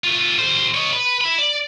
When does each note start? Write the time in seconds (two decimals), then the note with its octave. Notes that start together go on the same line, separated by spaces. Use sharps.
0.04 A3 F4
0.39 D#2 C5
0.74 C#5 D#5
0.93 B4
1.21 E5 B5
1.39 D5